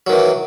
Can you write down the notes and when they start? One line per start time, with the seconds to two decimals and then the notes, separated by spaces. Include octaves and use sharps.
0.07 F#3
0.09 D#3
0.12 E3